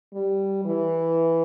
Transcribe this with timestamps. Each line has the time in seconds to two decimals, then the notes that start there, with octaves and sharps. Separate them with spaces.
0.14 G3
0.65 E3